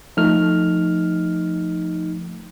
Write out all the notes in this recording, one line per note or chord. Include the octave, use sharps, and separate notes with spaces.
F3 A3 D#4 F6